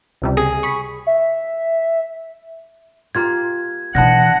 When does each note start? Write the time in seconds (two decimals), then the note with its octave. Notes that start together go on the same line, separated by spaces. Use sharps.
0.22 C#2 C3 G3
0.37 G#4
0.63 B5 C#6
1.07 E5
3.15 A#3 F4 G4 G#6
3.95 B2 D3 E3 B3 F#5 A5 F#6 A#6